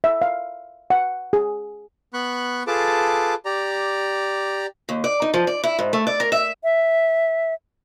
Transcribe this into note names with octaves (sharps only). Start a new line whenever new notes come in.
E5
F5
F#5
G#4
B3 B5 C#6 F#6
F4 G#4 A4 B4 A5 D6
G4 D5 A#5
D#2
D5
D#4
F3
D5
E4
G#2
A3
D5
A#4
E5
E5